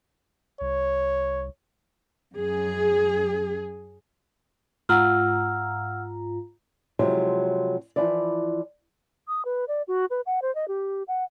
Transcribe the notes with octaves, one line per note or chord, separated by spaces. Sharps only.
C2 C#5
F#2 G#4
G#2 F4 F#5 A#5 E6 F6
C3 F3 F#3 G#3 E4
E3 F3 E4 D5
D#6
B4
D5
F#4
B4
F#5
C5
D#5
G4
F#5